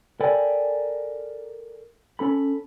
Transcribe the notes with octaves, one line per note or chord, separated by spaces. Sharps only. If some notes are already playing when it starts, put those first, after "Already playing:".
A4 A#4 D5 G5 G#5 B5
C#4 A4 B5